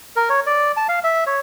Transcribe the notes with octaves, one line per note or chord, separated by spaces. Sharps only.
A#4
C#5
D5
A5
F5
E5
C#5